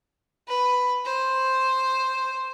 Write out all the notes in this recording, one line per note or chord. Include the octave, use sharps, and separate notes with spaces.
B4
C5